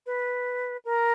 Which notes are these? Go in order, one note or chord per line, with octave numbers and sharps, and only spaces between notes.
B4
A#4